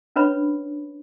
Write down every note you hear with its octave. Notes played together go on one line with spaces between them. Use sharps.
C#4 D4 B4 C#5 B5